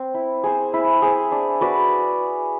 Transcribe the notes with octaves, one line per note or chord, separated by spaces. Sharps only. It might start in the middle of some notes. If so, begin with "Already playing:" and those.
Already playing: C4
E4
G#4 C5
E4
G#4 C5
D4
F#4 B4 D5